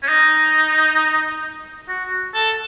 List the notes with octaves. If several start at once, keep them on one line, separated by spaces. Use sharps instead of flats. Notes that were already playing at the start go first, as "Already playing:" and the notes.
C#4
D#4
F#4
A4